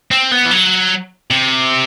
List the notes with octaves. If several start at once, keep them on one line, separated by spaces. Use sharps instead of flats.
C4
B3
E3
F#3
C3